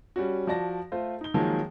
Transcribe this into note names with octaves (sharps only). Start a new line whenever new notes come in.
G3 C#4 F#4
F3 F#4 D5 A5 A#6
A3 F4 C5
D#4 G7
D#3 F3 F#3 G#3 A#3